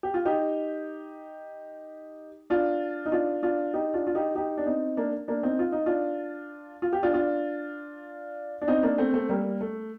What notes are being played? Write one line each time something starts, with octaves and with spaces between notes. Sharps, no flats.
G4
F4
D#4 G4
D4 F4
D#4
D4 F4
D4 F4
D#4 G4
D4 F4
F4
D#4 G4
D#4 G4
D4
C4 D#4
A#3 D4
A#3 D4
C4 D#4
F4
D#4
D4 F4
F4
G4
D4 F4
D4 F4
D4
C4 D#4
A#3 D4
A3 C4
A3 C4
G3 A#3
A3